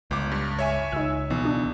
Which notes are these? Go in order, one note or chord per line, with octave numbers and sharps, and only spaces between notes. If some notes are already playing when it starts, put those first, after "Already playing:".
G1 C#2 D6
G2
C#5 E5 G#5
C#2 D#4 E6
B1 B2 E3
D4